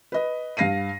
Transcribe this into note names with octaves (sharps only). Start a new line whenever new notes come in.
B4 D#5
G2 F5 A#6 C7 D#7